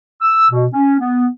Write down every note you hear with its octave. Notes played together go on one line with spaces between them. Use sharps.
E6
B2
C#4
B3